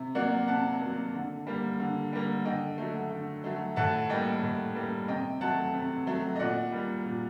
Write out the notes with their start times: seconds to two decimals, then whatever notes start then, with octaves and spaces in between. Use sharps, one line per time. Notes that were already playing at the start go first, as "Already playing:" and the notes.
Already playing: C3
0.15 F#3 A#3 D5 F#5
0.48 C3 F#5 A5
0.81 F#3 A#3
1.14 D3
1.47 G3 A#3
1.80 D3
2.13 G3 A#3
2.45 D3 D#5 G5
2.78 F#3 A3
3.11 D3
3.44 F#3 A3
3.76 A2 F#5 A5
4.10 G3 A#3 D#5 G5
4.43 A2
4.75 G3 A#3
5.08 C3 D#5 G5
5.41 F#3 A3 F#5 A5
5.74 C3
6.07 F#3 A3
6.36 D#5
6.39 A#2 D5 F#5
6.72 G3 A#3
7.05 A#2